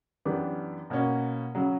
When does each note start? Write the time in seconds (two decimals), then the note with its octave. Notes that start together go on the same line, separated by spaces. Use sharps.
0.25 F#2 E3 B3 D4 G4
0.90 B2 A#3 C#4 F#4
1.55 C#3 F#3